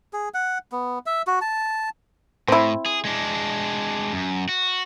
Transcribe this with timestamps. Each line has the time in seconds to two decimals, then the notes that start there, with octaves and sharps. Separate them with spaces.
0.13 G#4
0.34 F#5
0.72 B3
1.06 E5
1.27 F#4
1.41 A5
2.48 A2 C4 E4
2.86 G#4
3.05 G#3 D4
4.13 F#2
4.49 F#4